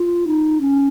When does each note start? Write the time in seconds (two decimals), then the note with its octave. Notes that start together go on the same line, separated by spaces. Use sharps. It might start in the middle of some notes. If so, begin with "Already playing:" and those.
Already playing: F4
0.27 D#4
0.61 C#4